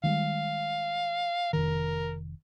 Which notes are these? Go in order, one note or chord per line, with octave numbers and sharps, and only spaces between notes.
D#3 G3 G#3 F5
F1 A#1 D#3 A#4